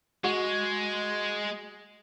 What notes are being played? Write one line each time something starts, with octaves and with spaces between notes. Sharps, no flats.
G#3 F#4